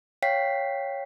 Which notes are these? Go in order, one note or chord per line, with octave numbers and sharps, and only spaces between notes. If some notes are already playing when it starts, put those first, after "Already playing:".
C#5 F5 G5 B6 C7